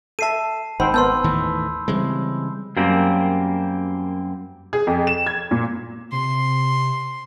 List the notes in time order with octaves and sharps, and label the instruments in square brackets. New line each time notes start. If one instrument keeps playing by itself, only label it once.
[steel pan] A4 E5 [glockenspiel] A5 C7 D#7
[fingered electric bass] G#1 [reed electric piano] D#4 F#5 E6 [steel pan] C5 G5 [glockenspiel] B5
[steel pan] B3 A#4 C5 [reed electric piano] A5 [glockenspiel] C6 E6 G6
[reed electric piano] D#2 [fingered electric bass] A2 D#3 E3
[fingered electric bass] C#3 E3 G#3 [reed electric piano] G3 C4
[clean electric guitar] F#2 G3 A#3 C4
[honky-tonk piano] G#4
F2
E7
G#6
A#2
[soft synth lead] C3 [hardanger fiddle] C6